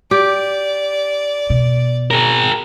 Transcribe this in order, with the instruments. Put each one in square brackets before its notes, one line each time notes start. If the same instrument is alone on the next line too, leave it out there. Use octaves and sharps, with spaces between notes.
[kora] G4 [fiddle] D5
[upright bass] B2
[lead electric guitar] G#4 A#4